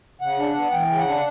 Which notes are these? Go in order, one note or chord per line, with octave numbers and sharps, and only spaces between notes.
C#3 F#5
D4
B3
E3 G5
C#3
F#5
D4